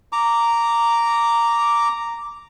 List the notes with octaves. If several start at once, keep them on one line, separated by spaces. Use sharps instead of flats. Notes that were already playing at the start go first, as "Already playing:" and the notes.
A#5 D6